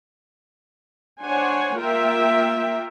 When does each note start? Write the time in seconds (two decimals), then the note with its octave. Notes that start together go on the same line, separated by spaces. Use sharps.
1.23 D4 C5 C#5 F#5 G#5
1.77 A#3 F4 A#4 E5 G5